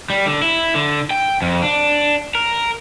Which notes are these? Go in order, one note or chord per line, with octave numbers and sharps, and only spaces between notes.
G3
D3
E4
D3
G5
F2
D4
A#4